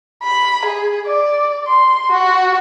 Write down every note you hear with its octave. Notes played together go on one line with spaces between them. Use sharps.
B5
G#4
D5
C6
F#4